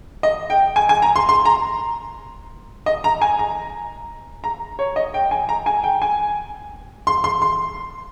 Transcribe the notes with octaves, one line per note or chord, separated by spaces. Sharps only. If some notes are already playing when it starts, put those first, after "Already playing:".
D#5
G5
G#5
G#5
A#5
C6
C6
A#5
D#5
A#5
G#5
A#5
A#5
C#5
D#5
G5
G#5
A#5
G#5
G5
G#5
C6
C6
C6